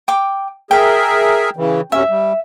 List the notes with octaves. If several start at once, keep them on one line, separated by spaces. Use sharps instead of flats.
G5 D6
G#4 A#4 E5 G5
C#3 E3
F#2 C3 C#4 E5
G3